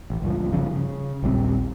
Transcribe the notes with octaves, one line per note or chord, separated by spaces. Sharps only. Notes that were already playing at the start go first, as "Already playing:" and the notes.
A1
C#2 G2 F3
G#1 G2 C#3 F3
C#3
A#1 D#2 G3 C4